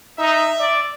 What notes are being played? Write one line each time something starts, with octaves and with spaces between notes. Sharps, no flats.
D#4 E5
D5